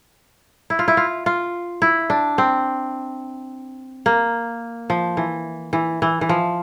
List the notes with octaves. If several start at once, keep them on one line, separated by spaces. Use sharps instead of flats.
E4
F4
E4
F4
F4
E4
D4
C4
A#3
F3
E3
E3
E3
E3
F3